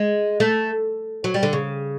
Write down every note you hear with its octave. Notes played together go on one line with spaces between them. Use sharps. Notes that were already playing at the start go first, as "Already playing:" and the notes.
Already playing: G#3
A3
F#3
G3
D3
C#3